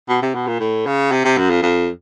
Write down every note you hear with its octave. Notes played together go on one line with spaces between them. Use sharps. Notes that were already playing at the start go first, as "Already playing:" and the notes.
B2
C3
B2
A#2
A2
C#3
C3
C3
F#2
F2
F2